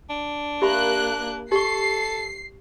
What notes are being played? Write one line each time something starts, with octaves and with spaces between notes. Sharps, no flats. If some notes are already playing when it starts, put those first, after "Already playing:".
D4
A#3 G4 E5 B5 F#6
G4 A4 C#6 C7